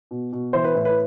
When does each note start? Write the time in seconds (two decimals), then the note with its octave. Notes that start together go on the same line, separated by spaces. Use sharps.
0.11 B2
0.33 B2
0.53 E3 C5
0.64 B4
0.75 A2
0.85 B4